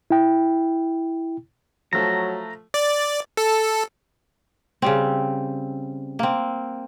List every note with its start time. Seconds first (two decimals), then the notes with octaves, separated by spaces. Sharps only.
0.10 E4 G5
1.93 F3 F#3 A3 A#5
2.74 D5
3.37 A4
4.82 C#3 G3 C4
6.19 A#3 C4